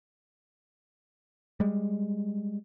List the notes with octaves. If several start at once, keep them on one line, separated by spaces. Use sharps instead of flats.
G3 G#3